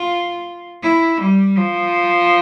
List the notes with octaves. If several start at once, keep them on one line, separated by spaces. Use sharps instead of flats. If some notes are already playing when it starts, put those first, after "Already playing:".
Already playing: F4
E4
G3
F3